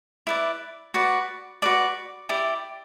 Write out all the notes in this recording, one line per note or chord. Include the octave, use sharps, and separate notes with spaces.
E4 B4 D5
F#4 B4 D5
F#4 B4 D5 D6
E4 G4 D5